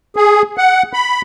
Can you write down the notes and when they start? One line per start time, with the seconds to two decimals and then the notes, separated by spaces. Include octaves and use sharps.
0.16 G#4
0.58 F#5
0.93 B5